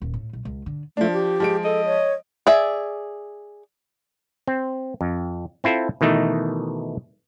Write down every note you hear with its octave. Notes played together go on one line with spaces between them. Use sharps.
D#1
A2
B1
C#2
D3
F3 A3 D4
G4
F3 G#3 D7
A4 D#5
C#5
G#4 D5 E5
C4
F2
C4 E4 F4 A4 C5
B2 D#3 E3 A3 D#4